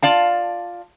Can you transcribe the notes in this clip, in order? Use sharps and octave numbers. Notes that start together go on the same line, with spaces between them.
F4 D5 F5 A5